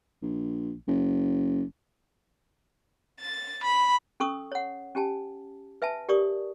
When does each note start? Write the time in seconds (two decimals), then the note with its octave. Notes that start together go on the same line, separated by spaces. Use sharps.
0.22 A#1
0.88 F#1
3.20 A6
3.63 B5
4.20 C#4 A4 C#6 D#6 E6
4.52 C#5 F#5
4.95 C#4 G4 G#5 A5
5.82 B4 E5 G#5 A5
6.09 G4 A#4 D5 C#6 D#6